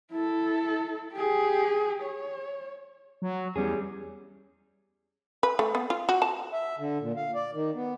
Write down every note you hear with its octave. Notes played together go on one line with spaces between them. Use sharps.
E4 A4
G4 G#4
C#5
F#3
E2 G3 C#4 G#4
B4
A3
B3
F4
F#4
A5
E5
D3
A#2
F5
D5
D#3
B3